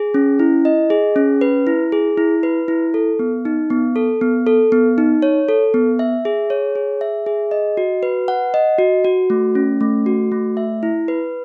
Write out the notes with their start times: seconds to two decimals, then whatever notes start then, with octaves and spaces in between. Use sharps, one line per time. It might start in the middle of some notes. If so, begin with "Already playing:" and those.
Already playing: G#4
0.14 C#4
0.40 E4
0.65 D#5
0.90 G#4
1.16 C#4
1.41 B4
1.67 E4
1.92 G#4
2.18 E4
2.43 B4
2.68 E4
2.94 A4
3.19 B3
3.45 D#4
3.70 B3
3.96 A4
4.21 B3
4.47 A4
4.72 B3
4.98 D#4
5.22 C#5
5.49 A4
5.74 B3
5.99 E5
6.25 G#4
6.50 C#5
6.75 G#4
7.01 E5
7.26 G#4
7.51 D#5
7.77 F#4
8.03 B4
8.28 F#5
8.54 D#5
8.79 F#4
9.05 F#4
9.30 A3
9.55 C#4
9.81 A3
10.06 F#4
10.32 A3
10.57 E5
10.83 E4
11.08 B4